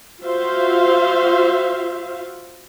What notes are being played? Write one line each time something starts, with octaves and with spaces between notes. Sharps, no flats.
F4 F#4 C5 E5 F5